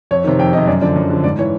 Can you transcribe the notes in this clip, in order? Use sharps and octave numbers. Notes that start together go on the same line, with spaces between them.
F2 C#5
C3 D#3
F2 G5
C3 D#3 D#5
F#2 D5
D3 F3 D5
F#2
D3 F3
G#2 D5
E3 C#5